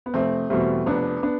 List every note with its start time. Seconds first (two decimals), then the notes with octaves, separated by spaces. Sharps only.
0.06 B3
0.14 F1 A3 C4
0.50 E2 B2 G3 A3 C4
0.86 F1 B3 D4
1.23 B3 D4